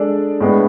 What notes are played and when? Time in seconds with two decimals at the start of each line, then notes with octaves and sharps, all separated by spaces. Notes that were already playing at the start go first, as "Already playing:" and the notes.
Already playing: G#3 D4 A4 D5
0.41 A2 G#3 B3 D4